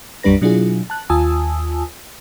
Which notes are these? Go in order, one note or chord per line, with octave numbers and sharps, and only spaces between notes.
B1 F#2 G3 D4 B4 A#6
B2 F#3 D4 E4 F4 G#4
A5 F#6
D#2 F4 G#5 A5 D#6 E6